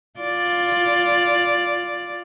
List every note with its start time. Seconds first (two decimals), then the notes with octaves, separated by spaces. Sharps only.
0.20 F4 D5